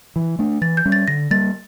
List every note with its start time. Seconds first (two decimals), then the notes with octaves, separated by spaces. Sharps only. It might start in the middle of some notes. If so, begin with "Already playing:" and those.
0.16 E3
0.39 A3 D4
0.61 E3 A6
0.77 G6
0.86 G3 C#4
0.92 A6
1.08 D3 A#6
1.31 G3 A#3 A6